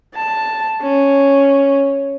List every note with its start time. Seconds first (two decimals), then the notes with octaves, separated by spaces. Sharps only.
0.16 A5
0.82 C#4